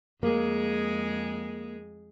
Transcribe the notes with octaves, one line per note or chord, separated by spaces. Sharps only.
F2 G#3 A#3 G#4